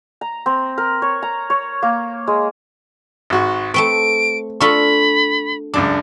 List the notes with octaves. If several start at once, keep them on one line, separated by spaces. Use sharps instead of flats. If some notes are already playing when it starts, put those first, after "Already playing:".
A#5
C4
A#4
C#5
A#5
C#5
A#3
G#3
G#1 F#4
A3 C4 B4 C#6 D7
D4 F4 A4 B5 C#6
C#2 F#2 D4 D6